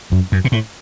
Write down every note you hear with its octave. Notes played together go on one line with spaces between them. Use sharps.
F#2
F#2
B2
A2